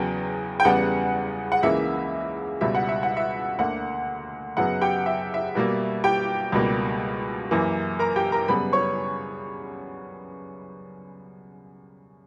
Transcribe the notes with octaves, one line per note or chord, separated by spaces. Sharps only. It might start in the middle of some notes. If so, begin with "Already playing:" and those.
Already playing: E2 C#3 F#3 B3 G5
G5
E2 C#3 G3 B3 F#5
F#5
C#2 C#3 E3 A#3 E5
C#2 B2 G3 E5
F#5
E5
F#5
E5
D2 D3 A#3 F#5
F#2 C#3 F#3 B3 F#5
G4 G5
E5
E5
B2 G3 A#3
G4 G5
C#2 B2 G3 A#3
F#2 E3 A#3
A#4 A#5
G4 G5
A#4 A#5
F#2 C#3 G3 B3 B4 B5
C#5 C#6